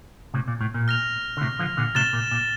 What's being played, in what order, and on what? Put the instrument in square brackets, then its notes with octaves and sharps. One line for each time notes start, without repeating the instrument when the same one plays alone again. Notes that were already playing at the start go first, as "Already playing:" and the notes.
[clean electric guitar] A2 C3
A#2
A2
A#2
[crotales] F6 A#6 F7
[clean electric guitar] D3
A2 C3
D3 F3
A#2 D3
[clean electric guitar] A2 C3 [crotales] A6 E7 G7
[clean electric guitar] A#2
A#2